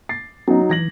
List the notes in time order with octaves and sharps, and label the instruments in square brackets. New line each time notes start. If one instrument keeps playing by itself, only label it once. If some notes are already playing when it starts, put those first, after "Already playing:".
[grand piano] A6 C7
[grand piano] F#3 D#4 [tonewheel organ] B3 C#4
[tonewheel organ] E3 [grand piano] G#6 A#6 F#7